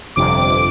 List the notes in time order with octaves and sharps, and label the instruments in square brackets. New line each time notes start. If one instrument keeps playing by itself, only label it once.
[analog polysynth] G1 F2 C3 D6